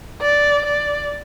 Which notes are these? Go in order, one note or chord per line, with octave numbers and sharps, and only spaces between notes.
D5
D5